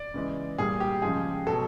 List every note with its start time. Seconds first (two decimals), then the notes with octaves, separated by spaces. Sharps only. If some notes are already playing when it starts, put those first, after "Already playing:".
Already playing: D5
0.14 C#3 E3 G#3
0.58 A#2 G3 G#4
0.80 G4
1.02 C#3 F3 G#3 G#4
1.47 B2 F#3 A4